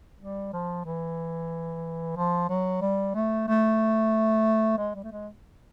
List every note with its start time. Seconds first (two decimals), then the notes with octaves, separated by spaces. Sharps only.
0.20 G3
0.53 F3
0.85 E3
2.17 F3
2.49 F#3
2.82 G3
3.15 A3
3.48 A3
4.78 G#3
4.95 G3
5.04 A3
5.11 G#3